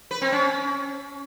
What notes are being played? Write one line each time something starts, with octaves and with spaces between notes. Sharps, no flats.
B4
C4
C#4